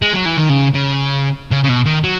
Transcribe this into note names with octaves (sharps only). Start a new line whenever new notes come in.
G#3
F#3
E3
D#3
C#3
C#3
C#3
C#3
B2
D#3
F#3